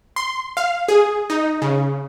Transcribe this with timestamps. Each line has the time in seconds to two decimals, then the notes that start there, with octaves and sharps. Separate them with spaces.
0.16 C6
0.57 F5
0.88 G#4
1.30 D#4
1.62 C#3